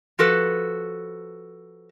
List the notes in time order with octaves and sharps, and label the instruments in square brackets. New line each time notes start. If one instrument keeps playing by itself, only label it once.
[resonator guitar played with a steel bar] F3 F#4 A4 B4